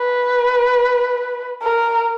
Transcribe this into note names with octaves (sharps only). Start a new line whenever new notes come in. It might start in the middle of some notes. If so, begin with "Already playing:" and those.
Already playing: B4
A#4